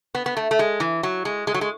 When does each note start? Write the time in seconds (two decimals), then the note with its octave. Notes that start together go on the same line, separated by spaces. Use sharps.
0.15 B3
0.26 B3
0.37 A3
0.51 A3
0.59 G#3
0.80 E3
1.03 F#3
1.25 G#3
1.47 G#3
1.54 F#3
1.61 G#3